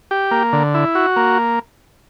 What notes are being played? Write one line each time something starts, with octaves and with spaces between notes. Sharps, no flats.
G4
A#3
D3
E4
F#4
A#3